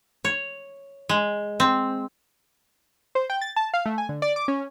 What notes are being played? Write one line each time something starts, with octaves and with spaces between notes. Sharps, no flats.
C#5
G#3
C4
C5
G5
A6
A5
F5
A3
G#5
D3
D5
D6
C#4